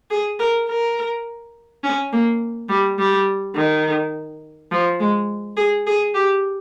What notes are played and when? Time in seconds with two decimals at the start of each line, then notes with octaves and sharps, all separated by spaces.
0.10 G#4
0.39 A#4
0.68 A#4
1.84 C#4
2.12 A#3
2.69 G3
2.98 G3
3.56 D#3
4.72 F3
5.00 G#3
5.57 G#4
5.87 G#4
6.14 G4